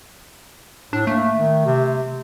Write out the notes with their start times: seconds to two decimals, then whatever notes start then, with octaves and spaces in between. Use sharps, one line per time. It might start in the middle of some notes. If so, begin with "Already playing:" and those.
0.93 A2 D4
1.07 A3 A#3
1.34 D#3
1.66 C3